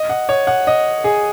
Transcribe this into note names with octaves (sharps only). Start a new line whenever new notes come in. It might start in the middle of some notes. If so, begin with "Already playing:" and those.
Already playing: D#5
F#5
C#5
F#5
D#5
G#4